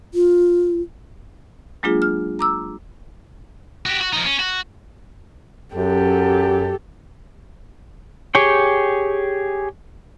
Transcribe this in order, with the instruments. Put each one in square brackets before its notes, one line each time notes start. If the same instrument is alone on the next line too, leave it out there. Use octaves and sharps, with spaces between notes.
[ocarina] F4
[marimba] F#3 G#3 A#3 D4 F4 G#4
F6
A#5 D6 E6
[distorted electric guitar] F#4 G4
F#4
F3 D#4
C#4
F#4
[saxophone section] F#2 [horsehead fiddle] G4 A4
[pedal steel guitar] G4 G#4 C#5 G5